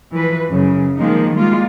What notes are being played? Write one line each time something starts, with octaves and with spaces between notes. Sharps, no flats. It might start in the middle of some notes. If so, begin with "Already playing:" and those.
E3 F3 B4
F#2 C#3
D#3 F3 G#3 A#3 D#4
G3 G#3 A#3 F4